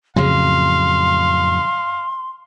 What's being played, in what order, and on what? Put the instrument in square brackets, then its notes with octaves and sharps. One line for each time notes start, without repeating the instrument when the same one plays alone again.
[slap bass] F2 A2 F#3 [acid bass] C#3 [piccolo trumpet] F5 [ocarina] C6